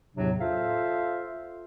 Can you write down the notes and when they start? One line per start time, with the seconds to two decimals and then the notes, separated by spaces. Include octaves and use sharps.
0.16 E2 A2 C3 F#3 D4
0.40 F4 A4 C5 E5 F5